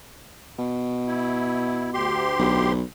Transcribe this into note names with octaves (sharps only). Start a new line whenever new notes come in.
B2
E4
D2 G4 C6
B1